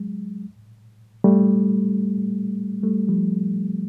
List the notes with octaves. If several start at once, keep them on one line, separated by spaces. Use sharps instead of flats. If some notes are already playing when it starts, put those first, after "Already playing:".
Already playing: F#3 G#3
G3 A3
G3 A3
F3 G3